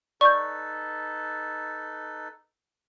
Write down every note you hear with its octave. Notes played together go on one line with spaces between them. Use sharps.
D#4 A4 B4 D5 C#6 G6